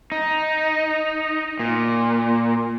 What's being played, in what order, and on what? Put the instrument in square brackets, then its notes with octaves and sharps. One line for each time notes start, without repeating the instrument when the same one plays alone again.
[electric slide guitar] D#4
A#2